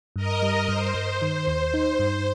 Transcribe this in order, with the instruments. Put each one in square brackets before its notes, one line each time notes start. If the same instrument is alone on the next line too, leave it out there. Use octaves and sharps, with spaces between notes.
[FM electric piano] G2 [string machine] A#4 D#5
[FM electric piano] G3
[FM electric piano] G2 [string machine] C5
[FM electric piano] G2
[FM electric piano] D#3 [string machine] C5
[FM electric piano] D#2
[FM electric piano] D#4 [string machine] C5
[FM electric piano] G2